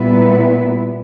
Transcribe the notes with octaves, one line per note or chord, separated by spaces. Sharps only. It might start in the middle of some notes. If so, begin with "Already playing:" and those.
Already playing: A#2 G3 B3 E4 B4